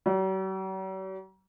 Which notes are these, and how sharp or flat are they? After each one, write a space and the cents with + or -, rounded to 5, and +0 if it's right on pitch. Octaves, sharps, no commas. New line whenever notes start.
F#3 +45